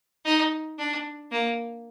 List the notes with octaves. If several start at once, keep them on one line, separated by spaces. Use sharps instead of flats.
D#4
D4
A#3